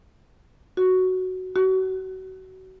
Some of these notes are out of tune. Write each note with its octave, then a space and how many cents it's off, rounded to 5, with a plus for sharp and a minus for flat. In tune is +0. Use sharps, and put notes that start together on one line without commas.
F#4 +5
F#4 +30